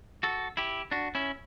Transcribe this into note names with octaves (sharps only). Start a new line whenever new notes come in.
F#4 A4
E4 G4
D4 F#4
C#4 E4